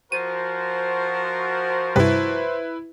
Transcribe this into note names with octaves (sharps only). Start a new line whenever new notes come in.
F3 F#4 A#4 C5 D#7
G2 C3 G3 E4 B4